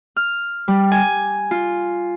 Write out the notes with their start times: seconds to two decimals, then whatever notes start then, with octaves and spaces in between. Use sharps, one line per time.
0.16 F6
0.68 G3
0.92 G#5
1.51 F4